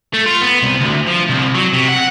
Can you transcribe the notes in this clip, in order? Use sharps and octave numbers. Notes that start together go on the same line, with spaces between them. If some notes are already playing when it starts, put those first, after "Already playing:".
A3
F4
B3
C2
D2
F3
C2
F#3
C3
F#5